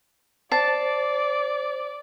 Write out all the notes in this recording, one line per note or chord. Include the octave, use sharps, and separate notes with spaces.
C5 D5 A5